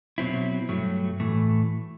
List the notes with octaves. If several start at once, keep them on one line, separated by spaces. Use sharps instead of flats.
B2 F#3 C4 E4
G2 F#3 A3
A2 E3 A3